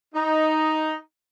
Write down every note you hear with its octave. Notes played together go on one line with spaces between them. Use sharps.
D#4